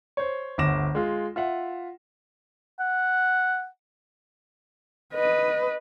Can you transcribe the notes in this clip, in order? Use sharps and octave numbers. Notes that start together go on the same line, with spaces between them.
C5 C#5
G1 D2 D6 A#6 E7
G#3 F4
F4 E5 F#5
F#5
B4 D#5